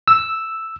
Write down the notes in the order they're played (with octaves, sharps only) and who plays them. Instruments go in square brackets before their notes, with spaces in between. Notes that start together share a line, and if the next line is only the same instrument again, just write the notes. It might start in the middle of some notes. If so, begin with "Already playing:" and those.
[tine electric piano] E6